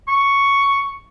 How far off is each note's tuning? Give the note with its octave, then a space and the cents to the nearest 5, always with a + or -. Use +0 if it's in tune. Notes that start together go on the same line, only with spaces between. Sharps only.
C#6 +5